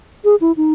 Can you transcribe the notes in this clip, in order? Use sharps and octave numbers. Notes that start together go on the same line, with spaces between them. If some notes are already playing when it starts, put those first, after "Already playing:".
G#4
E4
D#4